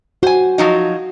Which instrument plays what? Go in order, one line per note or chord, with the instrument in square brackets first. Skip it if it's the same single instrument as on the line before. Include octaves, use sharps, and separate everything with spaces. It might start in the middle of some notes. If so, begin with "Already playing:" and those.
[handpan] F#4 [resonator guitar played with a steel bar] C5 G#5
[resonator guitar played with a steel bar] F3 F#3 D#4